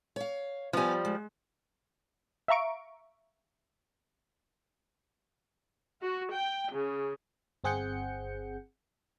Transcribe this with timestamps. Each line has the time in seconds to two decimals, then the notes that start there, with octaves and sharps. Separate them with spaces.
0.16 C#5 F5
0.73 F3 G3 B3 G#5
1.05 G#3
2.48 E5 F5 A#5 C#6 D7
6.02 F#4
6.31 G5
6.70 C#3
7.64 G1 C4 G#4 F#5 G6 C#7